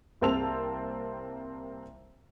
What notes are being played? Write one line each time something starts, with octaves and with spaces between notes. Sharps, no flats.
C2 A#3 C4 A5 E6 F7